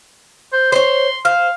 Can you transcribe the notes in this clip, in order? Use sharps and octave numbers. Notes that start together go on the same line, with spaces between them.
C5
C5 C#5 C6
C5 F5